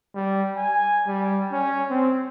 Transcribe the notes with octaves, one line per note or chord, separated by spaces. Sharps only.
G3
G#5
G3
C#4
C4